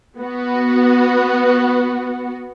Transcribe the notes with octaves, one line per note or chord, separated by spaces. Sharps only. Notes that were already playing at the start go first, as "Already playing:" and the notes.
B3 F#4